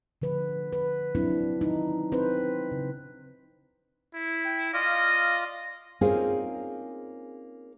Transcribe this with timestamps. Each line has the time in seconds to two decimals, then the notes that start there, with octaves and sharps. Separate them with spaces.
0.22 D3 F3 B4
0.73 B4
1.15 F#3 C4 D4 E4
1.61 D#4
2.12 C4 B4 C5
2.72 C#3
4.14 E4
4.45 G5
4.73 F4 D5 D#5 F5
6.01 A#3 C4 C#4 D#4 F4 G#4